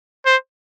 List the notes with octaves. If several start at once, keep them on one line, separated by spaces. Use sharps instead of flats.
C5